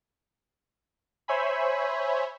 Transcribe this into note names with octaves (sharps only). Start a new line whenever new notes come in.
C5 C#5 E5 G#5 B5